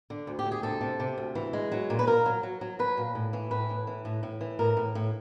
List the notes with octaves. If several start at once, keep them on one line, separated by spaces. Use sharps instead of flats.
D3
D2
G4
D2
G#4
C3 A4
C3
C3
D2
E3
G#3
F#3
A#2
B4
A#2 A#4
F#3
F#3
F#3
F#3 B4
A#2
A2
E3
A2 B4
A2
E3
A2
A2
E3
A2 A#4
A2
A2